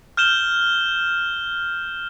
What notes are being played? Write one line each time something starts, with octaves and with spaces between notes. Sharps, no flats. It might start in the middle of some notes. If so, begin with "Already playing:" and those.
F6 G6 E7 G7